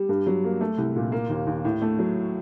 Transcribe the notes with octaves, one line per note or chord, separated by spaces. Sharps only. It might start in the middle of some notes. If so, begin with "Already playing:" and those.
Already playing: G3
G2
F#3
A#3
A3
C2
A#2
A#3
D#2
D#2
A2
A3
F#3